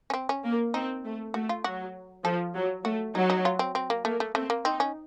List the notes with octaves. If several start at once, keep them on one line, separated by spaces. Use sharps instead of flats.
C#4
C4
C#4
A#3
C4 D#4
A3
A3 F#4
F4
F#3 F#4
F3 A4
F#3
A3 F#4
F#3 D#4
D#4
F4
C4
C4
A#3
A3 A#3
A3
A3 C4
A#3
C4 D#4
C#4